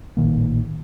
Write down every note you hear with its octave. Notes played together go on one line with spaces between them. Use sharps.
A1 A#2 D#3 A#3